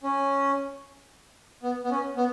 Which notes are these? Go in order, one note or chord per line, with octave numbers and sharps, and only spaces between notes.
C#4
B3
B3
C#4
B3